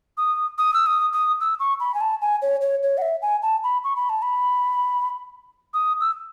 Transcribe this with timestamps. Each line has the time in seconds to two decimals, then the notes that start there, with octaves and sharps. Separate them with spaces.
0.18 D#6
0.58 D#6
0.74 E6
0.86 D#6
1.13 D#6
1.40 E6
1.60 C#6
1.80 B5
1.94 G#5
2.01 A5
2.22 G#5
2.42 C#5
2.61 C#5
2.83 C#5
2.98 F#5
3.02 E5
3.22 G#5
3.42 A5
3.64 B5
3.84 C#6
3.96 B5
4.10 A5
4.22 B5
5.74 D#6
6.01 E6